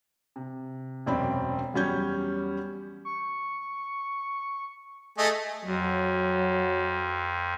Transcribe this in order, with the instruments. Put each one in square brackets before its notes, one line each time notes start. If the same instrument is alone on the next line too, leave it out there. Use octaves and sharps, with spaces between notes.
[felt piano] C3
E1 F#2 C4 D5 G5 B5
E2 F#3 G3 C#4 G6 G#6
[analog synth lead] C#6
[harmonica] A3 G#4 D#5
[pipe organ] F2 [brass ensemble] F#3